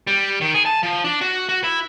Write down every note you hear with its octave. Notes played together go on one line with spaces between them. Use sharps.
G3
D#3
G#4
A5
F3
D4
F#4
F#4
E4